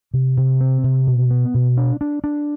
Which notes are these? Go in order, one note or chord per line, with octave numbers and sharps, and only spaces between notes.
C3
C3
C4
C3
B2
B3
B2
D4
D4
D4